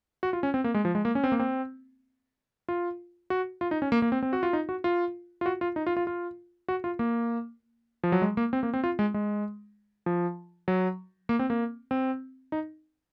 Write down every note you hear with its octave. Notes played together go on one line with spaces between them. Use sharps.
F#4
F4
C#4
C4
A#3
G#3
F3
G#3
A#3
C#4
C4
A#3
C4
F4
F#4
F4
D#4
C#4
A#3
A#3
C4
C4
F#4
F4
D#4
F#4
F4
F4
F#4
F4
D#4
F4
F4
F4
F#4
F4
A#3
F3
F#3
G#3
A#3
C4
A#3
C4
F4
G#3
G#3
F3
F#3
A#3
C4
A#3
C4
D#4